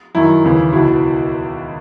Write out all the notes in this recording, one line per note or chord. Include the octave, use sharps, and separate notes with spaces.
F#2 D#3 E4
D#2 C#3 E3
C#2 B2 E4